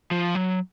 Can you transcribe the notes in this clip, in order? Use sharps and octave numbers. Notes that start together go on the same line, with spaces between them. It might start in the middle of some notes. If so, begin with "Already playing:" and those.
F3
F#3